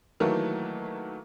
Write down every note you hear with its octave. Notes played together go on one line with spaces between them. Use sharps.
D#3 E3 F#3 A3 A#3